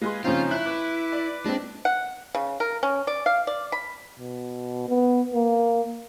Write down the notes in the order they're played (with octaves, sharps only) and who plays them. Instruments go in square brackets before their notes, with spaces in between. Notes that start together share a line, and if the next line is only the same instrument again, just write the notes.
[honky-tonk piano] G#3 G#4 C6 [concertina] B4 F5
[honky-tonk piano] C#3 F3 C4 [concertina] C#4 D#4 C5 [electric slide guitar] F4
[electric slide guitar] E4 [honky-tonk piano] F#6
[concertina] B4 D6 [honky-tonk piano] F#6
[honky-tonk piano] D5
[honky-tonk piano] G#3 C4 [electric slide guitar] D4
[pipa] F#5
C#3
A#4
C#4
D5
F5
D5
B5
[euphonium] B2
B3
A#3